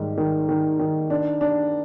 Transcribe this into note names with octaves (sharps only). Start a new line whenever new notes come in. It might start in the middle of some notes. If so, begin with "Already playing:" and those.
Already playing: G#2 D#3 G3
D#3
D#3
D#3
D4
D4